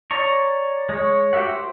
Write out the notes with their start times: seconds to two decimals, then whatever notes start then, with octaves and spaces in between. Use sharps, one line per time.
0.11 C#5 D5 A#5 C#6
0.89 G#3 C#5
1.33 F#4 G4 A#4 E5 F#5
1.50 C5